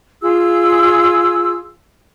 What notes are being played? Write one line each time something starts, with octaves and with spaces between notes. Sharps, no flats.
F4 G#4 E6